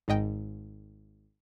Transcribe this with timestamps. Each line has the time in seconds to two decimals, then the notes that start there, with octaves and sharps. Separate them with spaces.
0.08 G#1 G#2 D#5 G5